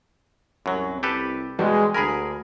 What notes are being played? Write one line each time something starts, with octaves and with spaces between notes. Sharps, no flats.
C2 F#2 F#3
G4 A4 B4
E2 B2 G3 G#3
D2 G#4 A#4 G#5 B5